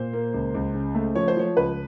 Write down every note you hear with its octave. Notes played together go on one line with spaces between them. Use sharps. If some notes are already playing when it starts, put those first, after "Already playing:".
Already playing: A#2 C5
A#3
C#2
C#2
C#3
A3
F3 C#5
C5
F3 C#5
C#2 B4